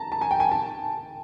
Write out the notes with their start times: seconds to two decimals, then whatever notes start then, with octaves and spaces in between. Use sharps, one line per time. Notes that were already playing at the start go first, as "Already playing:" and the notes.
Already playing: A5 A#5
0.12 A5
0.21 G#5
0.31 G5
0.40 G#5
0.51 A5